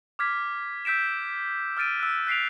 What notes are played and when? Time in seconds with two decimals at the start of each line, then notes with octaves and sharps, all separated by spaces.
0.19 D6 F6 G#6 B6
0.85 E6 G6 B6 D7 E7
1.77 E6 F6 A6 D7 D#7
2.00 E6 F#6
2.27 F#6 B6 C7 D7 F7